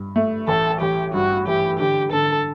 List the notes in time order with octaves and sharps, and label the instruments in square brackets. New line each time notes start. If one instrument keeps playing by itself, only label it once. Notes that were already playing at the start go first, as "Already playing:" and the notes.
Already playing: [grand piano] G2
A3
[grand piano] A1 [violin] A4
[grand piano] A1 [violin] G4
[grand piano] G2 [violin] F#4
[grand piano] E3 [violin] G4
[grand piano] D3 [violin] G4
[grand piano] D3 [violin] A4